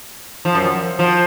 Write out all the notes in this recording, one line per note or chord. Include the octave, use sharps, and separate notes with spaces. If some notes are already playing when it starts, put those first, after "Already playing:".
F3
F#2
F3